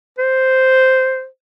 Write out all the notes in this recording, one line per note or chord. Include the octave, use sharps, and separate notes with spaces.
C5